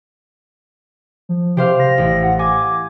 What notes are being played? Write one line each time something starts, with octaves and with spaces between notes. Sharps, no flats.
F3
C3 G4 C5 F5
A#6
A1
F#5
G#5 D6